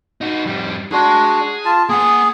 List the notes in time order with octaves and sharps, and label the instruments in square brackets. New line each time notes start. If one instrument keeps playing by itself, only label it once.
[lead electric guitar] D#4 F#4
F2 G3
[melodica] D4 F#4 [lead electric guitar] G#4 C6
[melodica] F4 A5
[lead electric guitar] A#3 F#5 [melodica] G#4